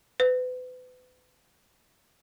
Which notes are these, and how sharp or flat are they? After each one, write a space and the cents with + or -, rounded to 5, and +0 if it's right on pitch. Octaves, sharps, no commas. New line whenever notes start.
B4 +35